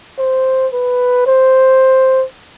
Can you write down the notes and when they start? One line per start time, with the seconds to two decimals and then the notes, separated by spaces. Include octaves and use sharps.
0.19 C5
0.73 B4
1.27 C5